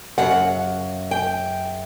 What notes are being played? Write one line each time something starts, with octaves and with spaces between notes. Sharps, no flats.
F#2 C#3 F#5
G5